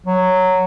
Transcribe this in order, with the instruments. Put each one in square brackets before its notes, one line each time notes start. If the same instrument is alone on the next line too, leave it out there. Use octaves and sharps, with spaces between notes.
[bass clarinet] F#3